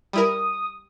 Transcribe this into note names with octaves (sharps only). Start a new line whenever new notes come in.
G3 E4 A#4 D#6